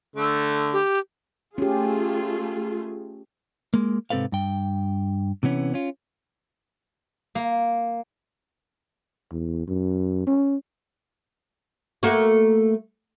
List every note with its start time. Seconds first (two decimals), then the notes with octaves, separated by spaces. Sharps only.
0.16 D3 A3
0.73 G4
1.58 A3 C#4 F4 G4 G#4
3.74 G#3 A#3
4.10 G#2 C3 C4 A4 B4 F5
4.32 G2 G5
5.43 C3 E3 B3 C#4
5.74 C#4 F4
7.35 A#3
9.32 E2
9.68 F#2
10.27 C#4
12.03 A3 A#3 F#4